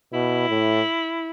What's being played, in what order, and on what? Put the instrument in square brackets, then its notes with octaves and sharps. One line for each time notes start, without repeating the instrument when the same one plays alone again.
[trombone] B2 [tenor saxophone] E4
[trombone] A2